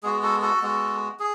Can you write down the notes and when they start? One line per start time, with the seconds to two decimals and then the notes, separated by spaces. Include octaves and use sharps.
0.03 G#3 B3 F#4 G#4
0.23 F#4 A4
0.42 F#4 A4
0.62 G#3 B3 F#4
1.20 G#4